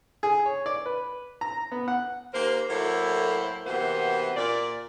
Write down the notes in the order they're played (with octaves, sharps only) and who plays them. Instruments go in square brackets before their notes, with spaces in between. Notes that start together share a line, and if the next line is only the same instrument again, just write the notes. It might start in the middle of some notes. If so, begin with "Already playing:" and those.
[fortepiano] G#4
C#5
D5
B4
A#5
B3
F#5
[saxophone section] D#2 A#3 A#4 C5
A2 F#3 A#3 E4 A4 C5
C3 E3 A#3 B3 F#4 C5
A#2 A#3 D5